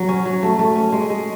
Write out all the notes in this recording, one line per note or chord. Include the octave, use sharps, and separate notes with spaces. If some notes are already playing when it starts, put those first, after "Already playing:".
Already playing: F#3
C#4
F#3
A3
A3
C#4
G#3
G#3